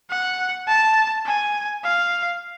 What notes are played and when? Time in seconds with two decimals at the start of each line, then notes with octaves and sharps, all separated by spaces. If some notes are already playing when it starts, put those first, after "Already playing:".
0.10 F#5
0.68 A5
1.26 G#5
1.84 F5